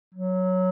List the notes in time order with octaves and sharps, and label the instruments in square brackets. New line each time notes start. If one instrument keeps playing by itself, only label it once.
[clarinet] F#3